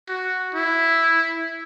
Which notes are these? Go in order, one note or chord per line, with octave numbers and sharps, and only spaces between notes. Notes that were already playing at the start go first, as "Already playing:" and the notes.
F#4
E4